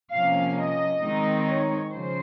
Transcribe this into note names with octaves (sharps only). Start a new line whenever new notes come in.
C3 F3 A#3 C#4 F5
D#5
D#3 G#3 C4 D#4
C#5
C#3 F3 C5